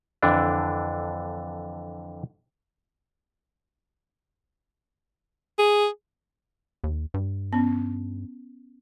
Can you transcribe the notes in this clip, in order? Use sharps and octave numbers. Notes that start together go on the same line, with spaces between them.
F2 D3 E3 D4
G#4
D#2
G2
B3 C#4